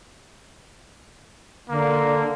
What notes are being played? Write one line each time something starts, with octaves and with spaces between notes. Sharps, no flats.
D3 A#3